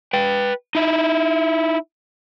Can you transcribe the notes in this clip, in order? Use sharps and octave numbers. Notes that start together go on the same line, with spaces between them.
B4 G5
D#4 E4